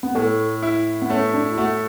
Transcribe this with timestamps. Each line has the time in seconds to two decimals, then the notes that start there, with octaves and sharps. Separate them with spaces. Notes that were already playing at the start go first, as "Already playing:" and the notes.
0.03 B3
0.15 A2 A3
0.62 E4
1.02 B3
1.10 A3 C#4
1.33 D4
1.51 E4
1.57 A3 F#4